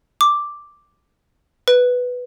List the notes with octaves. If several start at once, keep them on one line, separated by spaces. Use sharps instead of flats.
D6
B4